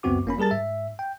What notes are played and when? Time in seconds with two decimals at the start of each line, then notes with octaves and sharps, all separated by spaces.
0.03 C#2 F#2 B3 C4 F#4 D6
0.25 G1 A#3 C#4 B5
0.38 G3 G#4 A#4 A5 A6
0.51 G#2 E5
0.99 G5